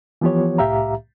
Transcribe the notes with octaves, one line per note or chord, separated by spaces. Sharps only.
E3 F3 B3 F4 G4 C#5
C2 A2 G4 E5 F5 A#5